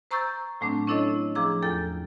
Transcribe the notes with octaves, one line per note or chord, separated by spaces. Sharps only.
C5 A#5 C#6 E6 G6 A6
A2 F#3 A3 C4 D4
C#4 D4 E4 A4 C#5 D#5
F3 G#4 A#5 D6 E6
E2 F4 A4 G5 G6 A6